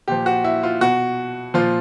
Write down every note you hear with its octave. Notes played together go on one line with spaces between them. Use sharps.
A#2 F3 G4
F#4
E4
F4
B2 F#4
A#2 F3 F4